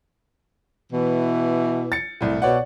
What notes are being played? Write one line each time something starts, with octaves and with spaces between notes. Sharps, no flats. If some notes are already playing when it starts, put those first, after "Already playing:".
B2 E3
A6 C#7
C2 A2
B2 C#5 D5 F#5